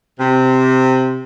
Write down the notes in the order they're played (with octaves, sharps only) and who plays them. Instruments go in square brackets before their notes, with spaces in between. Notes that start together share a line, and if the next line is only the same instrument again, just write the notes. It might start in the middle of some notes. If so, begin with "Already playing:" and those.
[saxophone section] C3